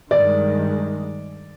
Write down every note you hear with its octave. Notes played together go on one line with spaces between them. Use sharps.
G2 D#3 G#3 D5